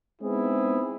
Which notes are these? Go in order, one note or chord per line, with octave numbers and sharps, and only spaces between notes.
G#3 B3 C4 D#4 E4 G#4